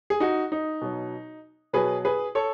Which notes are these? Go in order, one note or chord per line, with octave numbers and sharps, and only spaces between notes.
G#4
D#4 F#4
D#4
B2 F#3
B2 F#3 G#4 B4
G#4 B4
A4 C#5